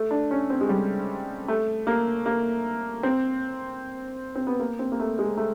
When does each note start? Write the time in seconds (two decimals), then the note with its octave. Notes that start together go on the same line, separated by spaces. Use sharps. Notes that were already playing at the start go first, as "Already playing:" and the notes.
Already playing: A3
0.11 D4
0.31 C#4
0.50 C4
0.61 G#3
0.69 G3
1.48 A3
1.87 A#3
2.26 A#3
3.03 C4
4.35 C4
4.47 B3
4.60 A#3
4.79 C4
4.92 A#3
5.00 A3
5.19 G#3
5.37 A3